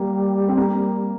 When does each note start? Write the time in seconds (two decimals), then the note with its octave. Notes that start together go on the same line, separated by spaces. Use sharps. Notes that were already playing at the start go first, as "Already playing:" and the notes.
Already playing: G3 A#3
0.48 C4
0.57 A#3